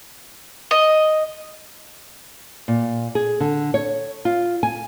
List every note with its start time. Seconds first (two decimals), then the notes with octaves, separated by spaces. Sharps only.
0.71 D#5
2.68 A#2
3.15 G#4
3.40 D3
3.74 C#5
4.25 F4
4.63 G#5